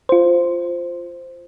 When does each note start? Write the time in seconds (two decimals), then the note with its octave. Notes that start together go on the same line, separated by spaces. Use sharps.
0.09 F4 C5